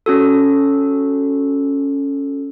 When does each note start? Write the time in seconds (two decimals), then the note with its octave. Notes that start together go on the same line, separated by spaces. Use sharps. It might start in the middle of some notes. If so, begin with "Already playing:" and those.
0.06 C#4 F#4 A4